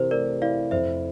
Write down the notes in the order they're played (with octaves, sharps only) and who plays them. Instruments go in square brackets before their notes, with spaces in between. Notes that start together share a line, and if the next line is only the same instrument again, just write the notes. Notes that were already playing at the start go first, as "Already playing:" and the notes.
Already playing: [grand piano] C3 E3 [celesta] G4 A#4 C5
[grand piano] A3 [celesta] A#4 D5
[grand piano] E4 [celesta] D5 F5
[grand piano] F2 [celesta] C5 E5